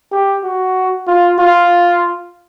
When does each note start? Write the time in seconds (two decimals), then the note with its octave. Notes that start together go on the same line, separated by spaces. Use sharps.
0.12 G4
0.43 F#4
1.07 F4
1.39 F4